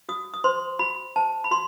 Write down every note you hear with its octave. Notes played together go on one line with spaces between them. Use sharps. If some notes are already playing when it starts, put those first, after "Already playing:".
F#4 D#6
D#6
C5 C6
F#4 B5
C5 A5
B5
F#4 C6